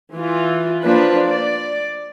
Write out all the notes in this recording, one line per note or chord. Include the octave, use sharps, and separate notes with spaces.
E3 F4
F3 A#3 D4 F4 B4
D5